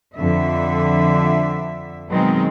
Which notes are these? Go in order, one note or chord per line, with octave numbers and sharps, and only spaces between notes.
F2 D3 E5
B2 D#3 F#3 G#3 C4